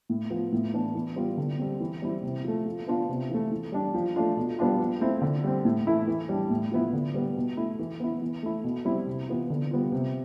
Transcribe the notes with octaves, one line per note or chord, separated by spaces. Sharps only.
A2
F3 B3
A2
E3 B3 D4
E3
G3 B3 F4
D3
G3 C4
E3
G3 C4 E4
C3
F3 A3
F3
B3 D4 F4
C3
E3 A3
E3
G3 D4
F3
A3 D4 F4
B2
G3 B3 D4 F4
F3
A3 C4 E4
D3
G3 C4
A2
E3 A3 E4
E3
G3 D4
A2
F3 B3 E4
D3
G3 B3
B2
A3 E4
E3
B3 E4
E3
A3 E4
B2
G3 C4 E4
C3
E3 B3 F4
D3
G3 B3 F4
C3